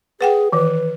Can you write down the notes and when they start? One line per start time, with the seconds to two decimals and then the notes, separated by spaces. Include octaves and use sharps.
0.21 G#4 B4 F#5 G5
0.52 D#3 E3 B4